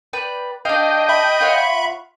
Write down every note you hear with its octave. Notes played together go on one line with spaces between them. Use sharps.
B4 D5 G5
D4 D#5 F5 G5
E5 B5
F4 C#5 F#5